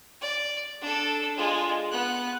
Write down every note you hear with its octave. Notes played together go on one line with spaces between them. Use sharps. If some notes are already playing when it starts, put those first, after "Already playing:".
D5
D4 A4
G#3 F4
B3 F#6